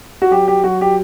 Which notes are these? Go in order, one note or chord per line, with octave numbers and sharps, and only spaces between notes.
F#4
F#3 G4
G4
F#3 F#4
G4